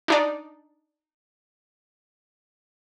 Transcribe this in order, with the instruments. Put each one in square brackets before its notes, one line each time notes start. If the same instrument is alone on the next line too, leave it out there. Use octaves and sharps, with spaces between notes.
[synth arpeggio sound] D4 D#4 D5